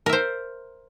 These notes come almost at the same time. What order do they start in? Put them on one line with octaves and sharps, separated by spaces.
A#4 E5 C5